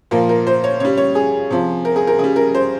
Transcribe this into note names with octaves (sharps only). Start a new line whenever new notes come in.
A#2 F3 A#4
A#4
C5
C#5
C#3 G3 C#5
C#5
G#4
C3 F3
A#4
G#4
A#4
C#3 G3 G#4
A#4
C5